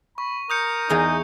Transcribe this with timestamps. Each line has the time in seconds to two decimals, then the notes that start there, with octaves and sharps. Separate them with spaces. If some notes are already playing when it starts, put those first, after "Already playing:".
0.18 B5 C#6
0.50 A#4 D#6 G6 C#7
0.89 E2 D#4 G#4 A#5